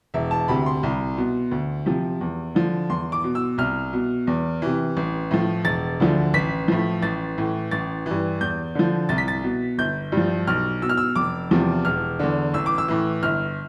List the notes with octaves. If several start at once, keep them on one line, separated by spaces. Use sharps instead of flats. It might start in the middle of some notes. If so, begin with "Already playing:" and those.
E1 E5
A5
D2 C3 B5
C6
C2
B2
D2
C3 F3
E2
D3 F3
E2 C6
D6
B2
E6
C2 F6
B2
E2
C3 E3
A1
A2 F3
E1 A6
D2 D3 F3
A1 B6
A2 F3
A1 A6
A2 E3
A1 A6
G2 E3
E2 G6
D3 F3
C2 A6
B6
A6
B2
G1 G6
G2 F3
B1 F6
B2 E6
F6
E6
F1 D6
E2 C3 F3
E1 F6
E2 D3
A1 E6
D6
E6
A2 E3
G1 F6